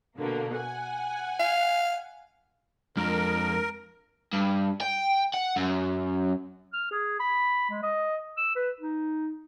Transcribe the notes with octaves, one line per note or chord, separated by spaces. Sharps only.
B2 D3 A#3
F#5 G#5
F5
F2 G#3 D4 A#4
G2
G5
F#5
F#2
F6
G#4
B5
G#3
D#5
E6
B4
D#4